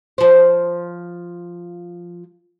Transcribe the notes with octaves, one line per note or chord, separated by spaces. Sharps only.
F3 C5